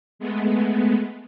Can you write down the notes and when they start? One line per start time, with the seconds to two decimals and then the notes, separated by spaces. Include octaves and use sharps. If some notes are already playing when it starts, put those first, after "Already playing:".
0.19 G#3 A3 B3